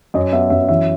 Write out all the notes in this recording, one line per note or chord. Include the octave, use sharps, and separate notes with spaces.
F#2 D#5
B3 E5
F#2 E5
E3 E5